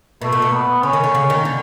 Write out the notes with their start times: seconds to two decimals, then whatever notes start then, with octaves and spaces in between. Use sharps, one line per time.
0.22 B2 A3
0.33 A#2
0.42 B2
0.53 B3
0.83 D3 C#4
0.93 D#3
1.04 D3
1.15 C#3
1.30 D#3
1.45 D3